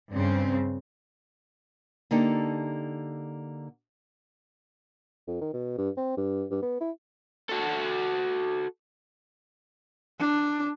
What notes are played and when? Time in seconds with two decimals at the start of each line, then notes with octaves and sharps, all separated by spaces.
0.13 G2 C#3 C4
2.11 D3 A#3 D#4 G4 A4
5.27 F2
5.41 D#3
5.53 B2
5.78 G2
5.97 C4
6.17 G2
6.51 G2
6.62 B3
6.81 E4
7.49 F#4 A4
10.19 D4